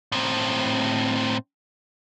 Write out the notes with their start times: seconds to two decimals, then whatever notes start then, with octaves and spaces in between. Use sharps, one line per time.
0.12 A2 C4